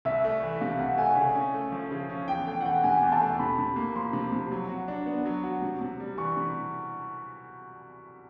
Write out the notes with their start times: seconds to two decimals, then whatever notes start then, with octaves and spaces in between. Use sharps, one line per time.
0.05 C2 E5
0.25 A3
0.42 E3
0.60 C3 F5
0.79 C2 F#5
0.98 A3 G#5
1.17 C#3
1.35 C#4
1.54 A3
1.72 F3
1.91 C#3
2.09 C#4
2.28 E2 G5
2.46 A3 G5
2.61 F#5
2.65 E3 G5
2.84 C3 G#5
3.03 E2
3.12 A5
3.21 A3
3.40 C3 B5
3.58 C3
3.76 A#3
3.95 F3 C6
4.13 C3
4.32 C3
4.52 F#3
4.69 F#4
4.88 D4
5.06 B3
5.26 F#3
5.44 F#4
5.62 C3
5.81 C3
6.00 G3
6.18 E3 C#6
6.37 C3